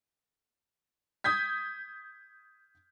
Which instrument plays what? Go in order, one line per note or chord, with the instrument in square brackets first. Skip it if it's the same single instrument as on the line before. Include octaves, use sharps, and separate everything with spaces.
[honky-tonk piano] D#6 G6 G#6 B6